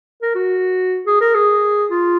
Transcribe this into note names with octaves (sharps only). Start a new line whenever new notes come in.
A#4
F#4
G#4
A#4
G#4
F4